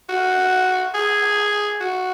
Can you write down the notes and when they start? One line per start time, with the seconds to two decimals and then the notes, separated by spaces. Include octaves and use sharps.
0.09 F#4
0.94 G#4
1.80 F#4